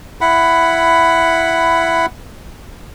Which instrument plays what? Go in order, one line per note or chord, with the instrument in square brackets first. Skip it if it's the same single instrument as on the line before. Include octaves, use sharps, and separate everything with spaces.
[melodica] E4 F#5 B5